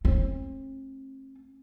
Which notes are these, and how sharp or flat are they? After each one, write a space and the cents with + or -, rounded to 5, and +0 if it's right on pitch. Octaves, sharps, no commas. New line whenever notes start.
A3 -10 C4 +45